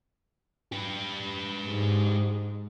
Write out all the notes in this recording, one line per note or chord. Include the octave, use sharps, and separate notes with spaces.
G4 B4
G#2